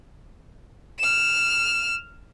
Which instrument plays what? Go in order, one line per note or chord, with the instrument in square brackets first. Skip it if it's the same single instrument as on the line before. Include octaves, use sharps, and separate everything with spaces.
[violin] F6 E7